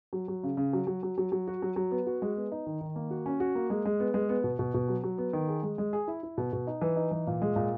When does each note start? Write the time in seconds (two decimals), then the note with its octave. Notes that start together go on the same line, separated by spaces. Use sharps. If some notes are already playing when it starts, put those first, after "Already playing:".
0.13 F#3
0.28 F#3
0.43 C#3
0.57 C#3
0.73 F#3
0.87 F#3
1.03 F#3
1.18 F#3
1.32 F#3
1.48 F#4
1.62 F#3
1.76 F#3
1.91 B3
2.07 F#4
2.22 G#3
2.37 B3
2.52 D#4
2.67 D#3
2.81 D#3
2.96 A#3
3.10 F#4
3.26 C#4
3.40 F#4
3.55 A#3
3.70 G#3
3.85 G#3
4.00 B3
4.14 G#3
4.29 B3
4.44 B2
4.59 B2
4.74 B2
4.88 F#3
5.03 F#3
5.18 B3
5.33 D#3
5.48 G#4
5.63 G#3
5.78 G#3
5.93 G#4
6.08 E4
6.23 E4
6.38 B2
6.53 B2
6.67 D#4
6.81 E3
6.96 D#4
7.11 E3
7.27 A#2
7.42 G#3
7.56 A#2